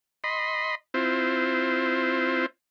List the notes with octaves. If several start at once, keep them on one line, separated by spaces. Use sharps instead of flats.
D#5 B5 C6
C4 E4 F4 C5